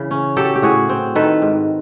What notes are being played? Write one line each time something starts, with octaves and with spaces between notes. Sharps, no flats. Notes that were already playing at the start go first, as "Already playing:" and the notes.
Already playing: C#3 E3
C#4
F#3 G4 A4
G4
A2 F#4 G#4
C4
D#3 A4 B4
G#2